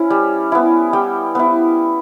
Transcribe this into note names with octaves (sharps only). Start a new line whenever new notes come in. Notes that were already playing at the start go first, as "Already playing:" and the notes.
Already playing: C#4 E4
G3
B3 E4
G3 G5
B3 E4